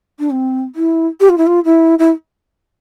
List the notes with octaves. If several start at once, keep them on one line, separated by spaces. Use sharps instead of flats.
D4
C4
E4
G4
F4
E4
F4
E4
E4